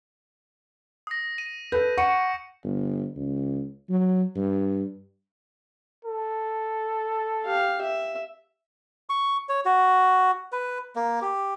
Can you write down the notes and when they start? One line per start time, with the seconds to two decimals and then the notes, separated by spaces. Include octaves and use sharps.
1.07 D#6 A#6
1.38 D#7
1.72 A4 B4 G6
1.97 F#5 C#6 C#7 D#7
2.64 G1
3.16 C#2
3.90 F#3
4.36 G2
6.05 A4
7.45 G4 F5
7.81 E5
9.09 C#6
9.49 C#5
9.65 F#4
10.52 B4
10.96 A#3
11.22 G4